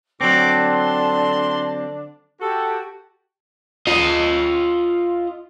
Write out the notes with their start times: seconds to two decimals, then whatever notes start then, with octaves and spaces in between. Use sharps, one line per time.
0.21 D3 F#3 C4 D4 A5 D6
0.67 C6
2.41 F#4 G4 A4 A5
3.87 F4 D#5